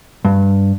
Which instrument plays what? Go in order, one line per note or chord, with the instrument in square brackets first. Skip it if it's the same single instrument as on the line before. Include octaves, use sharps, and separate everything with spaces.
[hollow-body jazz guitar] G2